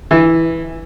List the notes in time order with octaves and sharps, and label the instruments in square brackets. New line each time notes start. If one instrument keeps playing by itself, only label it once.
[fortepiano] E3